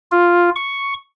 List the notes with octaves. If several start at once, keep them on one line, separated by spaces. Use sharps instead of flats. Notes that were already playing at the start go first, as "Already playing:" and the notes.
F4
C#6